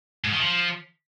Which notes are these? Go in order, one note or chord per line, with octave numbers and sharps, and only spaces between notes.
G#2
D#3
F3